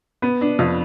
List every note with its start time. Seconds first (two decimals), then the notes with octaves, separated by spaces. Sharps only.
0.22 B3
0.41 D4
0.59 F2